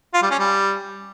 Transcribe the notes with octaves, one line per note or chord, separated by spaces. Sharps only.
F4
G3
C#4
G3